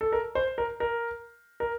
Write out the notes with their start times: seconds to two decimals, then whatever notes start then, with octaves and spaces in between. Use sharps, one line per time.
0.01 A4
0.12 A#4
0.35 C5
0.58 A#4
0.80 A#4
1.60 A#4